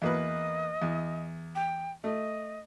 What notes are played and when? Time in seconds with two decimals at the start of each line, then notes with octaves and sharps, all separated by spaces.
0.02 E2 A#3 B4 D#5
0.82 E2
1.55 G5
2.04 A3 D#5